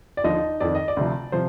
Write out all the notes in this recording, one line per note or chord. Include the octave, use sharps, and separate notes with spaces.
D5
D#2 D3 F3 D#4 D#5
F2 D#3 D5
D#5
D5
D2 C3 F3
C3 F3 C5